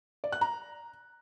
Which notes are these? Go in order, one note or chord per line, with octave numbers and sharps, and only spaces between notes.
D5
F#6
A#5